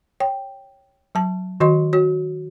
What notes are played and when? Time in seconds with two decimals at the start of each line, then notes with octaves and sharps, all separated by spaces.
0.20 C#5 G5
1.15 F#3 A5
1.60 D#3 F#4 D#5 C6
1.93 F#4 C#5